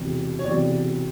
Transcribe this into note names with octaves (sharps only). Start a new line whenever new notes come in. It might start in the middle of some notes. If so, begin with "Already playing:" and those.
Already playing: E1 E2 C3
C#5
E1 E2 C3 D5